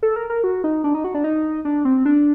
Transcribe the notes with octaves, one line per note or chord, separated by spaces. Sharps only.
A4
A#4
A#4
F#4
D#4
D4
D#4
F#4
D4
D#4
D4
C4
D4